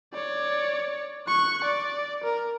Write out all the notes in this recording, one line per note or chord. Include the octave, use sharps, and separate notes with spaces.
C#5 D5
C#6 F#6
D5
A#4